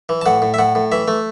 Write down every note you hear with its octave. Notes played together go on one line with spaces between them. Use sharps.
E3
A5
A2 F#5
A2
E5
A2 F#5
A2
E3 E5
A3